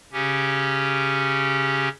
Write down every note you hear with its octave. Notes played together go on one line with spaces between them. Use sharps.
C#3 C#4 G4